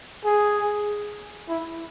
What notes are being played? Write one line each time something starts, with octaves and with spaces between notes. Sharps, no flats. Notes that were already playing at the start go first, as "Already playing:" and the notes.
G#4
E4